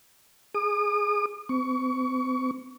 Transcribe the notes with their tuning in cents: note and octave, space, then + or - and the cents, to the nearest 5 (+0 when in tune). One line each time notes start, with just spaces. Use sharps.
G#4 +0 D#6 -40
C4 -35 C#6 +30